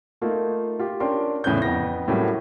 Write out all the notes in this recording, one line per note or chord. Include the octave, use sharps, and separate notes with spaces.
A3 A#3 D#4 F4
F4 G4
C#4 D4 A#4 G5 C6
E2 A2 C#3 C#4 F#6 G6
F2 B3 A#6
A2 F#3 G3 A#3 C#4 A4